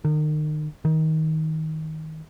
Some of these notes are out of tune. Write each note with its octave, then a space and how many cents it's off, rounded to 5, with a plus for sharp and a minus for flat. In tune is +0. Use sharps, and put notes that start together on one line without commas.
D#3 -35
D#3 +20